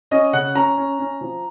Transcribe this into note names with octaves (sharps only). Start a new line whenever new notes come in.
C#4 D#5
C#3 F#5
C#4 A#5
C#4
C#4
F3